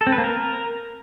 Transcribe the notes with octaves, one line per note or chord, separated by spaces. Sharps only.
A4
C4
B4
A#3
A#4